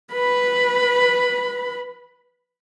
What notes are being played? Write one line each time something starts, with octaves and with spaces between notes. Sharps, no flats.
B4 B5